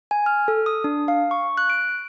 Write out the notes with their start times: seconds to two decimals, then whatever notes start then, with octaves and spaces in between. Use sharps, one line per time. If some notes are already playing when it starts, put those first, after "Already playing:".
0.11 G#5
0.26 F6
0.48 A4
0.66 D#6
0.84 D4
1.08 F5
1.31 C#6
1.57 F#6
1.70 D7